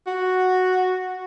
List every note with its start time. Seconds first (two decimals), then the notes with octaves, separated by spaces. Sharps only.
0.07 F#4